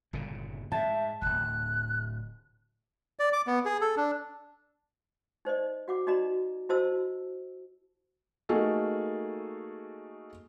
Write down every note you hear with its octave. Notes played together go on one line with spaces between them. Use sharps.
G1 A#2 C#3
G#2 E5 A5
D1 G#1 F#6
D5
D6
B3
G#4
A4
D4
D#4 C5 D5 D#5
F#4 F#5 D6
D#4 F#4 D5 D#5 A#5
E4 F#4 C5 D#5 A5 E6
A3 A#3 D#4 F#4 G#4 A4